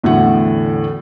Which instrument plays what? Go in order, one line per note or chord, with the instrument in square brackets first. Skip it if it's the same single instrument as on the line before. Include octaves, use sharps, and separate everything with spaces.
[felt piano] E2 A2 D3 A3 F#4 F#5